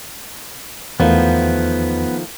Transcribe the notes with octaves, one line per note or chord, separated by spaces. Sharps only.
E2 D#3 F3 A3 B3